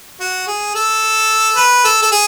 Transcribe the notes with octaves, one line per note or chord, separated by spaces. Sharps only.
F#4
G#4
A4
B4
A4
A4
G#4